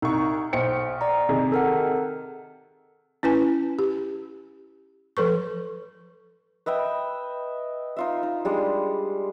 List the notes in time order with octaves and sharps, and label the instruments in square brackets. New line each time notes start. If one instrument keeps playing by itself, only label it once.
[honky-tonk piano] C2 C#6 [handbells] D#4
[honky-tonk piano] B1 G5 C#7 [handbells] C5
[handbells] D5 A#5
[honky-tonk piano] C3 D#3 G#4
[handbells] A4 A#4 F#5
[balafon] C#4 E4 B4 G#5
G4
F3 A4 B4 C#6
[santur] B4 D#5 E5 G5
D#4 F4 E5
D#4
G3 G#3 D4